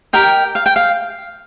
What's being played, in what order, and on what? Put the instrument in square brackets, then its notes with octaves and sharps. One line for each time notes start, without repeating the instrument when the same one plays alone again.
[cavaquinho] G4 A#4 D#5 G5
F5
G5
F5